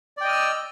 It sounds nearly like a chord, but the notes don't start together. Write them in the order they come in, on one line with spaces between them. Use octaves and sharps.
D5 G5 D#5 F6 E6